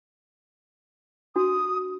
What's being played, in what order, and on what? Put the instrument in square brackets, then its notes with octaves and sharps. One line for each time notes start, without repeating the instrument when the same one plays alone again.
[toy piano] D4 F#4 [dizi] D#6